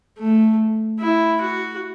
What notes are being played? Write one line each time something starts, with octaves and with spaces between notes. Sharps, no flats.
A3
E4
F#4